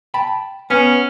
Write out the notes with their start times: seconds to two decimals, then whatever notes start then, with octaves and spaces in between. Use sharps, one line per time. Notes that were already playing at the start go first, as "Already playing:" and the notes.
0.14 G5 A5 B5
0.70 B3 C#4